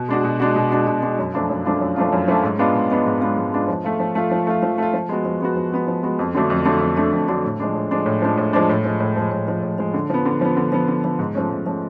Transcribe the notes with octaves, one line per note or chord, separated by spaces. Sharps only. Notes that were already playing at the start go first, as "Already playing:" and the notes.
Already playing: B2
G#3 D4 F#4
B2
G#3 D4 F#4
B2
G#3 D4 F#4
B2
G#3 D4 F#4
F#2
F3 A3 D4 F4
F#2
F3 A3 D4 F4
F#2
F3 A3 D4 F4
F#2
F3 A3 D4 F4
G#2
G#3 B3 D4 F4
G#2
G#3 B3 D4 F4
G#2
G#3 B3 D4 F4
G#2
G#3 B3 D4 F4
F3
A3 F4
F3
A3 F4
F3
A3 F4
F3
A3 F4
F3
G#3 B3 F#4
F3
G#3 B3 F#4
F3
G#3 B3 F#4
F3
G#3 B3 F#4
F2
D3 F#3 A3 D4
F2
D3 F#3 A3 D4
F2
D3 F#3 A3 D4
F2
D3 F#3 A3 D4
A2
F3 G#3 D4
A2
F3 G#3 D4
A2
F3 G#3 D4
A2
F3 G#3 D4
A2
F3 G#3
A2
F3 G#3
A2
F3 G#3
A2
F3 G#3
D3
F3 B3
D3
F3 B3
D3
F3 B3
D3
F3 B3
G#2
F3 A3 C#4
G#2
F3 A3 C#4